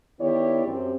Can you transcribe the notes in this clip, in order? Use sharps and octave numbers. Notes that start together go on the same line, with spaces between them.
D#3 B3 E4 G4 C#5 D5
F#2 C4 G4